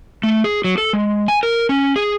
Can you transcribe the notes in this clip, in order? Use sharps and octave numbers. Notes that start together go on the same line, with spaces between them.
A3
G#4
F#3
A4
G#3
G#5
A#4
C#4
G#4